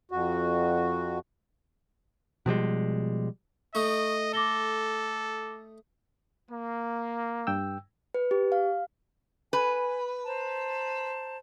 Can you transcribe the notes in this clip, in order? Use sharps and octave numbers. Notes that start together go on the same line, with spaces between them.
F2 F#4
B2 F3 G3 G#3
A3 D#4 D#5 C#6
A4 D6 A#6 G7
A#3
G2 G5 E6
B4
G4
F5
B4 G#5
C5 A5 A#5